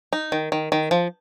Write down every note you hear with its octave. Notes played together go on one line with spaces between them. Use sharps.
D#4
D#3
D#3
D#3
F3